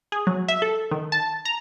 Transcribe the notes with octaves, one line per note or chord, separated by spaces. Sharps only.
G#4
F#3
E5
A4
D#3
A5
A#5